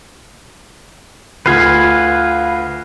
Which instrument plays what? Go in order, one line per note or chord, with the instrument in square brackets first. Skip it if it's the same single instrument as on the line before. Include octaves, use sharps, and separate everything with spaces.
[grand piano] D2 F4 [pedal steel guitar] B4 F5 G#5